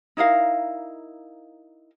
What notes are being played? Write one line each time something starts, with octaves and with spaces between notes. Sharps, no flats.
D#4 E4 A#4 F5